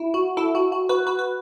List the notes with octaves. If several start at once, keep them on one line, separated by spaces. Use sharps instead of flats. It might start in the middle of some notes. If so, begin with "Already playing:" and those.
Already playing: E4
F#4
E4 A4
F#4
F#4
F#4 B4
F#4 B4
B4